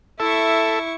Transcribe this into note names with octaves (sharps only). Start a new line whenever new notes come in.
E4 A4 E5 C#6